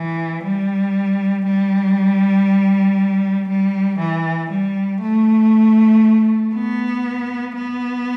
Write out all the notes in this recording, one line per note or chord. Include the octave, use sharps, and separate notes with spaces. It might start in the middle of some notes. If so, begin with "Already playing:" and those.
Already playing: E3
G3
G3
G3
E3
G3
A3
B3
B3